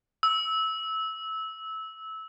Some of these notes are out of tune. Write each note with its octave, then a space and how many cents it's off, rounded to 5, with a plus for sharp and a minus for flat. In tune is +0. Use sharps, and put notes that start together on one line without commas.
E6 -20